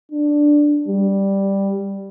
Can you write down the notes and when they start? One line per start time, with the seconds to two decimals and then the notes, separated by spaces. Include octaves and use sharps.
0.12 D4
0.88 G3